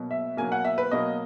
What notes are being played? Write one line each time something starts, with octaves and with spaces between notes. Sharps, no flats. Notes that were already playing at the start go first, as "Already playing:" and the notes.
Already playing: B2 F#3 A#3
E5
B2 F#3 A#3 G#5
F#5
E5
B4
B2 F#3 A#3 D#5